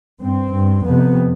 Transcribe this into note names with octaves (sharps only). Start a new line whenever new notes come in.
G2 C4
G2
F2 C3 B3